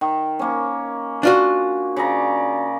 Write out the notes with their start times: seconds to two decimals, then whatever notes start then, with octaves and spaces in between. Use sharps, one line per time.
0.01 D#3
0.39 A#3 C#4
1.23 D4 F4 F#4
1.96 C#3 D5 A#5